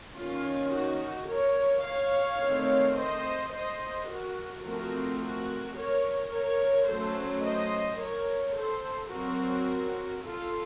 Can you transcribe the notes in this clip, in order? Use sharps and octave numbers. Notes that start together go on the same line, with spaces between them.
D#3 A#3 C#4 F4
D#4 F#4
A#4 C#5
C#5 F5
D#3 A3 C4
C5 D#5
C5 D#5
F#4 A#4
F3 A3 C4 F#4 A#4
F#4 A#4
A#4 C#5
A#4 C#5
F#3 A3 C#4 A4 C5
C5 D#5
A#4 C#5
A4 C5
F#3 C4 F#4 A#4
F4 A4